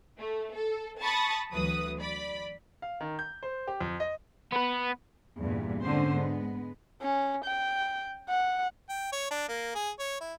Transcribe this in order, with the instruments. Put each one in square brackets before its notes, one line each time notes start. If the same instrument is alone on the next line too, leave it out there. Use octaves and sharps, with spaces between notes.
[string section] A3
A4
A5 B5 C#6 D#6 A6
D2 E3 F#3 B4 D#6
D5 B5
[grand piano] F5
D#3
G6
C5
G4
F2
D#5
[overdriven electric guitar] B3 B4
[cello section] E2 G2 A#2
G#2 D3 C4 C#4 C5
G#3 B3
[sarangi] C#4
G5
F#5
[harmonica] G5
C#5
D4
A#3
G#4
C#5
E4